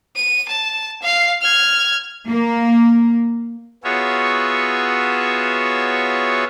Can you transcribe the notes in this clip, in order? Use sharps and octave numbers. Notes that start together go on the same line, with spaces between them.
D#7
A5
F5 C7
F6 G#6
A#3
B3 F4 F#4 G#4 C#5 E5